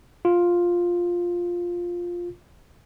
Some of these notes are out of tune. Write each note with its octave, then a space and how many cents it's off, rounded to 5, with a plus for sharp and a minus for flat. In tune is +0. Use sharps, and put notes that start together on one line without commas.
F4 +5